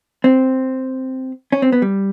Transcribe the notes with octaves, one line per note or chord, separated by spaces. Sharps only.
C4
C#4
C4
B3
G3